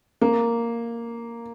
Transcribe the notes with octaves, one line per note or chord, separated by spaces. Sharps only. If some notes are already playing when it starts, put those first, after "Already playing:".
A#3